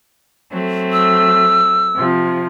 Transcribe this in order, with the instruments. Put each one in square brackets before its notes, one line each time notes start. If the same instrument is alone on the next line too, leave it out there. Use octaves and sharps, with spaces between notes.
[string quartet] F#3 A3 C4
[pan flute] E6
[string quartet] C3 F3